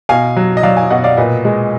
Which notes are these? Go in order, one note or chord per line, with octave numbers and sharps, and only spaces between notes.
B2 F5 G#5
F#3
D#5
F#3 D5 F5
F5 G#5
B2 D#5 F#5
D5 F5
A#2 B4 D#5
G#3